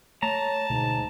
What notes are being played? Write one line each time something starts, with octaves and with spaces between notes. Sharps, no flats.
A3 C#5 A5 A#5
D2 G#2 B2